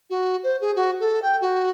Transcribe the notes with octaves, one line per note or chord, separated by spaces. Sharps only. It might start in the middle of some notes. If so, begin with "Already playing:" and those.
F#4
C5
G#4
F#4
A4
G5
F#4